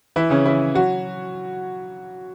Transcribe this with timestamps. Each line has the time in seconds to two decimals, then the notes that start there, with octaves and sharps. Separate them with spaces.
0.16 E3 E4
0.30 C#3 C#4
0.46 E3 E4
0.75 F#3 F#4